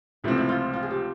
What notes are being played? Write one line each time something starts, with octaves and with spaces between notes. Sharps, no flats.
C#2 C3 F3 A3 C4 E4
E4
F4
F4
G#4
G4